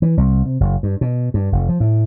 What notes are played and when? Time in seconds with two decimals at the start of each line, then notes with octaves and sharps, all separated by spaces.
0.02 E3
0.17 C2
0.46 C3
0.60 F#1
0.83 G2
1.01 B2
1.34 G2
1.52 F1
1.69 F3
1.80 A2